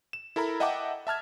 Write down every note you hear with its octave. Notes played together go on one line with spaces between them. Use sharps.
E7
E4 A4 A#4 A#5 B5
D#5 E5 F#5 G5 A5 D6
E5 A5 F6 G#6